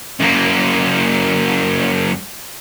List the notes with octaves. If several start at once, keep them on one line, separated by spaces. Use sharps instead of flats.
F#2 A#3